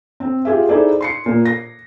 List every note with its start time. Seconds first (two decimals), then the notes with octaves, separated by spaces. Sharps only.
0.20 C4
0.45 F4 G4 G#4 E5
0.69 D#4 E4 G#4 A4 C5 D5
1.01 C6 C7 C#7
1.26 A#2 A#3
1.45 A#6